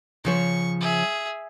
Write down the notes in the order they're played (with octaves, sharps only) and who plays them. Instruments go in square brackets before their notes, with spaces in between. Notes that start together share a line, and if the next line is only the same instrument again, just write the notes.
[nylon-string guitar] C#3 F3 C#5 [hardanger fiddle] C#6
[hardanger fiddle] G#4 E5